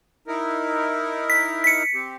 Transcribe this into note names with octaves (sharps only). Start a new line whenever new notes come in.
D#4 E4 A#4
B6
B6 C#7
C4 G4